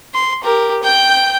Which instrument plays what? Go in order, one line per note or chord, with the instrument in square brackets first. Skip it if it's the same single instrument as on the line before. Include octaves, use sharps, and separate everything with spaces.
[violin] C6
G4 A#4
G5 G6